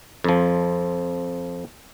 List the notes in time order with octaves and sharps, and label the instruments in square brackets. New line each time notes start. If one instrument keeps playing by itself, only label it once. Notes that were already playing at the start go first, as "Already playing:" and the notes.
[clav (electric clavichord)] F2 F3